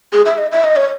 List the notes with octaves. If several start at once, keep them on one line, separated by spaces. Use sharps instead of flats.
G#4
E5
D#5
E5
D#5
C#5